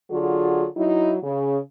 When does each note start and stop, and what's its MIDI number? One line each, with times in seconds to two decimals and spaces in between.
0.11 0.66 50
0.11 0.66 54
0.11 0.66 65
0.11 0.66 68
0.77 1.16 54
0.77 1.16 63
0.77 1.16 64
1.23 1.58 49